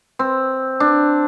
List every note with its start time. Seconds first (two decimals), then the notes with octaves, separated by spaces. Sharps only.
0.19 C4
0.80 D4